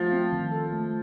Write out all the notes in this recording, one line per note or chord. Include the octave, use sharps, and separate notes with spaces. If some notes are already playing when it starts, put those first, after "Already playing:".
Already playing: F3 A3 F4
C4
D#3
A4
A3